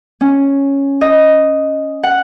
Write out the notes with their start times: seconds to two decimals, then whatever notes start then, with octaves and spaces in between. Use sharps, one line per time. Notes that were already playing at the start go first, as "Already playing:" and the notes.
0.21 C#4
1.01 D#5
2.03 F#5